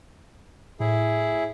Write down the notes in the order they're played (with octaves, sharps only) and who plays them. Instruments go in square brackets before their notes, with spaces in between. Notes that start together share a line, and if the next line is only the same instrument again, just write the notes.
[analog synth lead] A2 [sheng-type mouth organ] E4 G#4